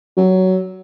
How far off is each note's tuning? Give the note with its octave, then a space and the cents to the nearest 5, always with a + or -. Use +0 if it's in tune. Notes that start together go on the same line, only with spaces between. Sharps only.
F#3 +15